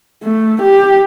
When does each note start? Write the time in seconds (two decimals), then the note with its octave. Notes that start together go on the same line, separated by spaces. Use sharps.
0.23 A3
0.62 G4